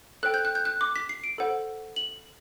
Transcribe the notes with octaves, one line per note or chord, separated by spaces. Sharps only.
A4 C5 G5 F#6
G6
F#6
G6
F#6
D6
B6
C7
D7
A4 C5 F#5
F#7